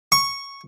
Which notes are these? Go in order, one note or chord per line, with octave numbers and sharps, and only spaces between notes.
C#6